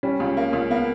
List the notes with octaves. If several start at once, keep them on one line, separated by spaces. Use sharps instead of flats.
G3 C#4
C#2
A#3
C#2
A#3 B3